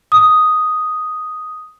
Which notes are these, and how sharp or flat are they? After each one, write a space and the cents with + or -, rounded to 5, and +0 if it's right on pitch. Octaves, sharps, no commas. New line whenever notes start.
D#6 +0